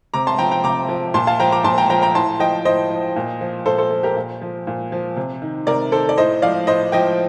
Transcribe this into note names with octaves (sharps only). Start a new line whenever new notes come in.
C3 A#5 D6
A5 C6
F3 G5 A#5
G5 A#5
C3 A#5 D6
F3
A#2 A5 C6
F5 A5
F3 G5 A#5
A#5 D6
A#2 A5 C6
G5 A#5
F3 G5 A#5
G5 A#5
A2 A5 C6
F3 D#5 G5
A2 C5 D#5
F3
A#2
F3
A#2 A4 C5
A4 C5
F3
G4 A#4
A#2
F3
A#2
F3
C3
D#3
C3 A#4 D5
D#3 A4 C5
D5
A2 C5 D#5
F3 D5 F5
A2 C5 D#5
F3 D#5 G5